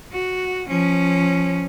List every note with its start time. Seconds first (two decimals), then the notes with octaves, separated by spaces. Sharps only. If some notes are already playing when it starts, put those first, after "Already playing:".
0.12 F#4
0.68 F3 C#4